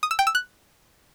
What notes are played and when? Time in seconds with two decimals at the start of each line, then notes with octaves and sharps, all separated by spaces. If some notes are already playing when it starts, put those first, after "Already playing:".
0.03 D#6
0.11 E6
0.19 G5
0.27 E6
0.35 F#6